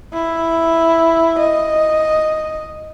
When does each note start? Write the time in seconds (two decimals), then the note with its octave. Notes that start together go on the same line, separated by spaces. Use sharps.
0.14 E4
1.40 D#5